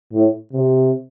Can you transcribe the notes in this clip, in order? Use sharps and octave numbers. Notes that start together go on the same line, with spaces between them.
A2
C3